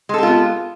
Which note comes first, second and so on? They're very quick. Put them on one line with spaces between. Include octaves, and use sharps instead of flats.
G#3 A4 G4 F4 B3